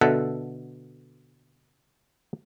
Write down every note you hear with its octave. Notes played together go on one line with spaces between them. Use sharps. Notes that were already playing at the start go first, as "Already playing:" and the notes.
B2 D3 A4 E5 F#5